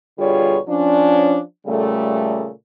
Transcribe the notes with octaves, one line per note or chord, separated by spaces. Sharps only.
B2 D3 G3 F4 G#4 C#5
F3 C#4 D4
A#2 C#3 G3 A3